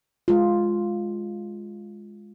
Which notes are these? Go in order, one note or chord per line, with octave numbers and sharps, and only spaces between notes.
G#3 F4